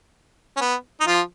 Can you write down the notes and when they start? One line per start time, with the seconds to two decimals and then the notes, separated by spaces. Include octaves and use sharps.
0.57 C#4
0.61 B3
1.01 D#4
1.07 F3 F4